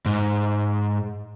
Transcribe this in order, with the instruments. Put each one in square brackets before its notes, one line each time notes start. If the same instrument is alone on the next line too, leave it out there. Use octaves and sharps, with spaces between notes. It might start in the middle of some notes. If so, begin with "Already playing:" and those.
[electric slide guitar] G#2